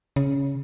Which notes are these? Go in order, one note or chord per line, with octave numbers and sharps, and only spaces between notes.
C#3